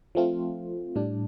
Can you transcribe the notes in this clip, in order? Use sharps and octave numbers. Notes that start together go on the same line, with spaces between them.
F3 A3 C4 F4
A2 G3 D4